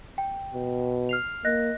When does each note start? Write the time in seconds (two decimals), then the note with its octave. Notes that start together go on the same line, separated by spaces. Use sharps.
0.18 G5
0.53 B2
1.09 F6 C7 F7
1.45 A#3 D#5 F#6 A#6